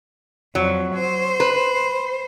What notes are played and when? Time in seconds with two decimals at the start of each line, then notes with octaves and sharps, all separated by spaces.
0.55 F2 F#3
0.94 C5
1.40 B4